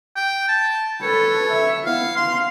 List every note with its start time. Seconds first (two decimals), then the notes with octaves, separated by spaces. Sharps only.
0.16 G5
0.48 A5
1.02 A4 B4 C#5
1.52 E5
1.86 B3 E4 F5
2.16 F5 C6